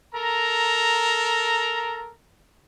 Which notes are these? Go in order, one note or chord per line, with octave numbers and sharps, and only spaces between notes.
A4 A#4 A#5